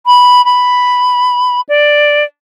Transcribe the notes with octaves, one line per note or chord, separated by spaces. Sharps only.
B5
B5
D5